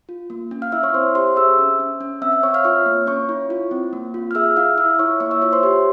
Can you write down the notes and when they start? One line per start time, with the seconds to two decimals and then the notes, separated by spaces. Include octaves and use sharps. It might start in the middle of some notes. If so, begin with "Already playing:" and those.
0.09 F4
0.30 A#3
0.51 C#4
0.62 F5 F6
0.72 E4 E5 E6
0.83 C#5 C#6
0.94 C4 C5 C6
1.15 G4 C5 C6
1.36 G#4 E5 E6
1.59 C#4
1.80 C#4
2.01 C#4
2.22 C4 E5 E6
2.32 E5 E6
2.43 C4 C#5 C#6
2.54 F5 F6
2.64 F4 C#5 C#6
2.86 A#3
3.07 C#4 C#5 C#6
3.29 E4
3.50 F4
3.71 C4
3.93 A#3
4.14 F4
4.31 F6
4.35 G#4 E5 E6
4.56 E4 F5 F6
4.78 E4 E5 E6
4.99 E4 C#5 C#6
5.20 A#3 C#5 C#6
5.31 E5 E6
5.42 F4 C#5 C#6
5.52 C5 C6
5.63 G4